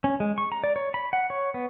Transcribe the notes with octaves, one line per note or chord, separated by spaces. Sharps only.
C#4
G#3
C#6
A#5
D5
C#5
B5
F#5
C#5
B3